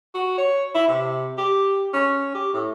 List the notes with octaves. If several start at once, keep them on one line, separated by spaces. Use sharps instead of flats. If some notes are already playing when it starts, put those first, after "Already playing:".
F#4
C#5
E4
C3
G4
C#4
G4
A2